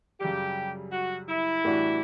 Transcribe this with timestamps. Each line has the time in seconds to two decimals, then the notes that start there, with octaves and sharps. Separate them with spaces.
0.21 F#2 C#3 G3 G4
0.92 F#4
1.29 E4
1.65 A2 E3 G3 D4 F#4